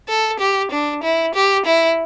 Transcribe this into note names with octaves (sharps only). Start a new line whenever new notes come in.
A4
G4
D4
E4
G4
E4